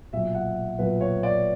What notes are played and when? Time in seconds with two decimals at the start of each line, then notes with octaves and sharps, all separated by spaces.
0.13 B1 A#2 F#3 E5
0.34 F#5
0.79 B1 A#2 F#3 B4
1.01 C#5
1.23 D5